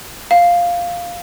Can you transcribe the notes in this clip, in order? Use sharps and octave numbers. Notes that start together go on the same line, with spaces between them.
F5